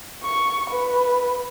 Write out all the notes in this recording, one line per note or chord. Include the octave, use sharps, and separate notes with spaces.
C#6
B4